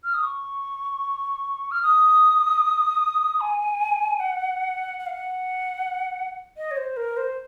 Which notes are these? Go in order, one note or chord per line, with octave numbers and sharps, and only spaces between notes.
F6
D#6
C#6
F6
D#6
G#5
F#5
F#5
F5
F#5
D#5
C#5
C5
A#4
C5